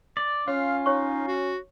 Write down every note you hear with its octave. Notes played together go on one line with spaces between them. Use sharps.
D5
C#4 F4 C#5 F5
D#4 C#5 C#6
F#4